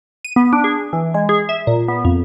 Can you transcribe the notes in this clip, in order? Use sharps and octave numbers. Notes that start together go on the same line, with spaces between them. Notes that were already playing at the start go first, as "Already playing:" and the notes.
D#7
B3
D4
G#4
E3
G#3
G#4
E5
A#2
B3
F2